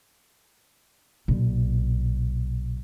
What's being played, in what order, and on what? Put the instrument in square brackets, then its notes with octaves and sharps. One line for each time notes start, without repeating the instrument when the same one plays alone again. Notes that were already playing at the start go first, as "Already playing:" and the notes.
[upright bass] B1 A#2